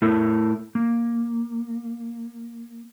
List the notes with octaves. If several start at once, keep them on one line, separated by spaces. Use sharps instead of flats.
A3 E4 A4 A#4
A#3